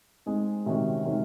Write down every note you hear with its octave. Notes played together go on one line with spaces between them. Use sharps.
G#3 C4 D#4 G#4
C3 D#3 G#3 C#4 F#4
C3 D#3 G#3 C#4 F#4